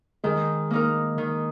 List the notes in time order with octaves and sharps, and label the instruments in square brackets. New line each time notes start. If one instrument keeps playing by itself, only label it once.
[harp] D#3 [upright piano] G#3
[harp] A#3 D#4 A#4
D#3